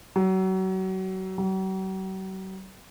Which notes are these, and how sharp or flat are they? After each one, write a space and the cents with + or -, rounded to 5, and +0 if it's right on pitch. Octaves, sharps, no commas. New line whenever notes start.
F#3 +30
F#3 +45